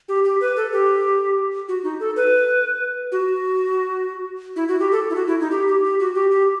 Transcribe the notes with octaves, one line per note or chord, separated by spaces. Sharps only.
G4
G4
B4
A4
G4
F#4
D#4
A4
B4
F#4
E4
F#4
G4
A4
E4
F#4
E4
D#4
G4
G4
G4
F#4
G4
G4